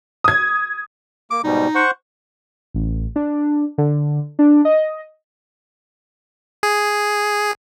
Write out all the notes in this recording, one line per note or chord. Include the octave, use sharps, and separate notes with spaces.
D#6 G#6
A#3 D6
G#2 B2 G3 D#4
C5 F#5 C#6
A1
D4
D3
D4
D#5
G#4